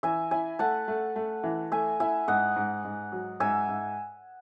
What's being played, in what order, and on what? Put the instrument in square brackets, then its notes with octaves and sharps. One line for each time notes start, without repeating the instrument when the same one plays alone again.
[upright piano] E3 [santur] E5 G#5
[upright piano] E4 [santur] E5 G#5
[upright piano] A3 [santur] F#5 A5
[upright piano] A3
A3
E3
[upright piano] A3 [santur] E5 G#5
[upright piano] E4 [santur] E5 G#5
[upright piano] G#2 [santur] D#5 F#5
[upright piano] G#2
G#2
F#3
[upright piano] G#2 [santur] E5 G#5
[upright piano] G#2